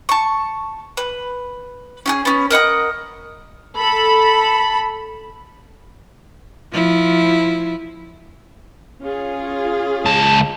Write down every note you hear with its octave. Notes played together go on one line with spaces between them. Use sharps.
A5 C#6
B4
C#4 F4 G#4
B3 C#4
A#4 D#5 F#5 D#6
A4 B5
F3 E4
C#4 F4 G#4
C#2 A5